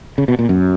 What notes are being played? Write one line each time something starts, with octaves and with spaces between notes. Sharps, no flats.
C#3
B2
A#2
F#2